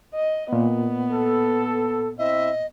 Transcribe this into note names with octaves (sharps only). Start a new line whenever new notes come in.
D#5
A#2 B3
A4
C4 E4 D#5 E5